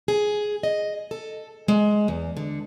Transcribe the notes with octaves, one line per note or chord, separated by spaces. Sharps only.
G#4
D#5
A4
G#3
E2
D3